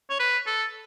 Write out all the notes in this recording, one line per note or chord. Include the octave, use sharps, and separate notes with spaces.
C#5
B4
A4